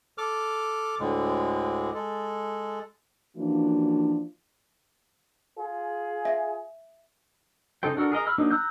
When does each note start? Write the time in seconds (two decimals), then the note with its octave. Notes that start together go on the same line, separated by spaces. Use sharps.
0.18 A4 D6 F6
1.00 D2 A2 D3 G#3
1.94 G#3 A4
3.37 E3 F3 A#3 C#4 D4 F#4
5.58 F4 G#4
6.25 E5
7.83 C#3 D#4 A4 C5 G5
7.97 D4 F#4 A4 A#4
8.12 G#4 A#4 D#5 A#5
8.27 B5 E6 F6
8.38 F#3 A#3 D4 D#4
8.51 A#5 E6 F#6 G6